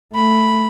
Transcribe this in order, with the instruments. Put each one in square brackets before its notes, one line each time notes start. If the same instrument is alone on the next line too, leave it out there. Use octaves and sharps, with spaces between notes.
[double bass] A3 [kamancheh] B5